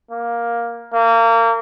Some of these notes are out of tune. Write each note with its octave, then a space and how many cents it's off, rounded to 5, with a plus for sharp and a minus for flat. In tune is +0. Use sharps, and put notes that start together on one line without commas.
A#3 +10
A#3 -30